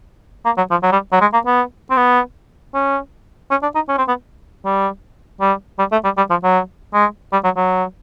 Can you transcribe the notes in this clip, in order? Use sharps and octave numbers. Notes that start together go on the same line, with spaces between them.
A#3
F#3
F3
F#3
G3
F#3
G#3
A#3
B3
C4
B3
C#4
C#4
D4
D#4
C#4
C4
B3
G3
G3
G3
A3
G3
G3
F3
F#3
G#3
G3
F#3
F#3